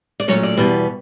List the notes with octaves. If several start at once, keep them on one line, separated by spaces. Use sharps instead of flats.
D5
A#2 F#3 A3 C#4 C#5
D5
E2 B2 G3 B3